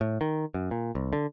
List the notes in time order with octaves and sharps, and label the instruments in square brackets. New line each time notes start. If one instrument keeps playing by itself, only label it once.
[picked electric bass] A2
D#3
F#2
A#2
C2
D3